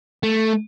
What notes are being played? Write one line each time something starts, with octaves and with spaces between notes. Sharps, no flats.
A3